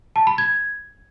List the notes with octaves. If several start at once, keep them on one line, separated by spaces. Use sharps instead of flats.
A5
B5
G#6